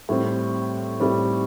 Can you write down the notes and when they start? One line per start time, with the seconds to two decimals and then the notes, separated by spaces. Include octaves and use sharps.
0.09 A2 G3 C4
1.00 A2 G3 C4